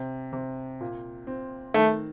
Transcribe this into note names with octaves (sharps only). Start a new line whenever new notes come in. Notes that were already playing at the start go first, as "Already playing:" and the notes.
Already playing: C3
C3
A#2
C4
D#3 A3